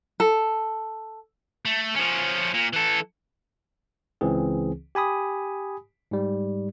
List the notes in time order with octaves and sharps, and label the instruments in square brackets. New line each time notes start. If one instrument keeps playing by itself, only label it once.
[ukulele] A4
[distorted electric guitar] A3
F3 C#4
A#2
E3 A4
[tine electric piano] C#2 C#3 E3 C4 G#4
G4 G#5 B5 D#6
G#2 G3